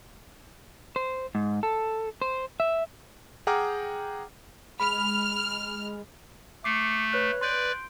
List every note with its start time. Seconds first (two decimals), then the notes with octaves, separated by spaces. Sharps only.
0.96 C5
1.35 G#2
1.63 A4
2.22 C5
2.60 E5
3.47 G#4 F#5 G5 A#5 D6 F6
4.80 G#3 B5 F6
6.64 A3 D6 C7 C#7
7.13 B4 C#5 F#6
7.41 B4 D5 C6 G6 D7